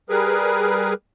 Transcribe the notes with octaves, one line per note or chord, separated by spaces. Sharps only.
G3 G#4 A#4 B4